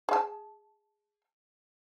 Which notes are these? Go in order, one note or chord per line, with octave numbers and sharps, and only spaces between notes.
G#4 A5